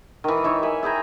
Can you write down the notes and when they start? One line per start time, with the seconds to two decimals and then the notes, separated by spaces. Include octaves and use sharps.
0.24 D#3 E3
0.44 D#4 C#5 E5
0.63 E5 G#5 B5
0.83 E4 G#4 G5 A#5